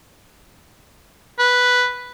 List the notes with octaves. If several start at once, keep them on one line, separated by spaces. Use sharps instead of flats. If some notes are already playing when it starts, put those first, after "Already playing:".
B4